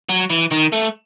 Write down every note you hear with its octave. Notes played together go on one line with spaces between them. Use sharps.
F#3
E3
D#3
A3